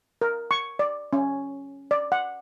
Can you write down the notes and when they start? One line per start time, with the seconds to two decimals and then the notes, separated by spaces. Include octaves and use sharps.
0.21 A#4
0.51 C#6
0.79 D5
1.13 C#4
1.91 D5
2.12 F#5